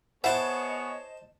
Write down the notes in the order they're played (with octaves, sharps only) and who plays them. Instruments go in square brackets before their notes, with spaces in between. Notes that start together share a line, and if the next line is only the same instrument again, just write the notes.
[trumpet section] B3 G#4 C#5 [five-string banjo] E4 F#5 [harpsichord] C5 A5 [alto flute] D#5